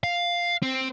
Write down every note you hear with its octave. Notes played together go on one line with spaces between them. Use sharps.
F5
C4